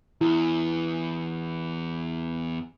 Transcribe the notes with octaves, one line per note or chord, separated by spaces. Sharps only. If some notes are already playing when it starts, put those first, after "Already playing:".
E2 E4